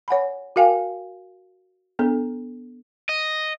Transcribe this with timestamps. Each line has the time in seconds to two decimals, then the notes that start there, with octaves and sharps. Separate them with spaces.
0.08 C#5 F#5 G#5 B5
0.56 F#4 A#4 F5 G5 G#5
1.99 B3 D4 A4
3.09 D#5